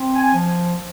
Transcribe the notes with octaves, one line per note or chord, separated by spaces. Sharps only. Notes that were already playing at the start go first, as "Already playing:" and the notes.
Already playing: C4
G#5
F3